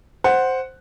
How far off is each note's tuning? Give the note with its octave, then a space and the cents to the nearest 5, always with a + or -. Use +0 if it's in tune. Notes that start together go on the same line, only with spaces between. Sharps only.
C5 +0 F#5 +0